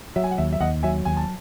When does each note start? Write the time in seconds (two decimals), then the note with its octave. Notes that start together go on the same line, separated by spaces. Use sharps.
0.16 F#3 E5
0.24 G#5
0.31 F#5
0.38 D#2 E5
0.53 E5
0.60 D#2 D#5 F#5
0.83 F#3 E5 G#5
1.05 D#2 G#5
1.17 A5